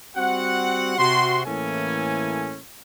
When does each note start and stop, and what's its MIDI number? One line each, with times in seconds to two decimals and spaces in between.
0.16 0.97 55
0.16 0.97 60
0.16 0.97 66
0.16 0.97 78
0.99 1.46 48
0.99 1.46 66
0.99 1.46 84
1.46 2.59 45
1.46 2.59 52
1.46 2.59 58
1.46 2.59 61
1.46 2.59 69
1.46 2.59 80